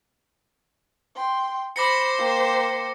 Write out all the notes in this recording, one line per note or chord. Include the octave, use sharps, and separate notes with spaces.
G5 C6
C5 B5 D6 A#6 C#7
A#3 G5